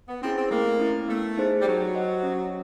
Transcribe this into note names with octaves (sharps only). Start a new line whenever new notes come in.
B3
C4 C#4 E4 G#4
C4
A3 A#3
C#4 E4
A3 B3
D#4 G#4 C5
G3
F#3 G4
C5 D#5 F#5
C#4